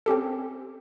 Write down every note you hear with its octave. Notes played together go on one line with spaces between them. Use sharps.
C4 C#4 G4 A4